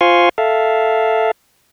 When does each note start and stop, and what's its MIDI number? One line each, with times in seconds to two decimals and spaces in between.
0.01 0.29 65
0.01 0.29 72
0.01 0.29 77
0.01 0.29 80
0.01 0.29 84
0.01 0.29 85
0.38 1.31 69
0.38 1.31 76
0.38 1.31 77